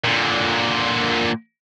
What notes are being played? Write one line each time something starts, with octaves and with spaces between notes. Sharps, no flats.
A#2 D3